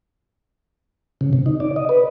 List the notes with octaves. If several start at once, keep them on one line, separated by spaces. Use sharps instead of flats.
C#3
C3
D#4
D5
D#5
B4